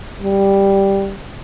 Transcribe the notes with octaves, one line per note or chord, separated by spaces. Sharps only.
G3